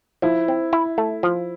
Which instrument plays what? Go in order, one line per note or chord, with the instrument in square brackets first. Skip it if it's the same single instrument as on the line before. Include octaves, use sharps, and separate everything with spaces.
[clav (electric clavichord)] F3 [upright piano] E4
[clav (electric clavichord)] C4
E4
A3
F3